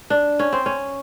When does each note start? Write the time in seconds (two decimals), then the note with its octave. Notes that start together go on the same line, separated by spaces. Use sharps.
0.10 D4
0.39 C#4
0.53 C4
0.66 C#4